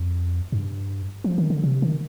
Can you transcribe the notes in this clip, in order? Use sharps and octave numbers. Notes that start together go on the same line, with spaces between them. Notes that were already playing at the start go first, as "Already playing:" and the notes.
Already playing: F2
G2
F3
D#3
D3
C3
D#3